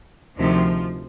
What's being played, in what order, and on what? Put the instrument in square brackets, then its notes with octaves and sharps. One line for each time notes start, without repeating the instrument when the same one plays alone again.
[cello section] D2 C3 D#3 F3